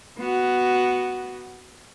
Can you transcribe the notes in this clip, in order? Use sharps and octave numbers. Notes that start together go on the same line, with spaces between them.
B3 F#4